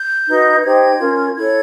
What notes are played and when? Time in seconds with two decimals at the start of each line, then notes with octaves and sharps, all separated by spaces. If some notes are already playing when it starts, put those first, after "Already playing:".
Already playing: G6
0.27 D#4 F#4 B4
0.64 D#4 G4 C5 G#6
0.99 C#4 F4 A#4
1.35 E4 A4 C#5 G#6